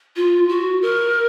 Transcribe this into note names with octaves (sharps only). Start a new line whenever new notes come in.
F4
F#4
A#4